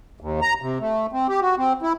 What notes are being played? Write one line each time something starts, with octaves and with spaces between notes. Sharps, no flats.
D#2
A#5
C3
A3
C4
G4
F#4
C4
E4